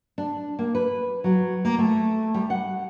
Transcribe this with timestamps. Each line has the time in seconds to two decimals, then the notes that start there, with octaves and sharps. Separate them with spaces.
0.18 D4
0.59 A#3
0.75 B4
1.24 F#3
1.65 A#3
1.79 A3
2.34 G3
2.50 F#5